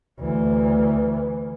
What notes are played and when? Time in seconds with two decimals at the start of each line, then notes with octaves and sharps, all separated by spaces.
0.20 D2 E3